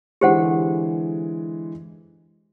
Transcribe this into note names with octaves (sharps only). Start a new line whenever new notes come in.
D3 E3 G#3 G4 C5 F#5